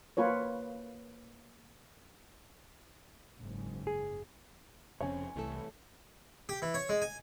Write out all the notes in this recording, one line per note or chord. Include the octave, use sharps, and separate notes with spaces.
A#3 F4 B4 C#5
F#1 G#2
G#4
F1 F2 C#3 C4 C#4 C#5 G#5
C2 E3 A3 A4
G4
E3
C#5
G#3
G#5